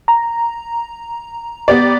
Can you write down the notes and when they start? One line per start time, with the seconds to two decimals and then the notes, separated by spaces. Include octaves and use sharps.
0.08 A#5
1.68 B3 G4 D5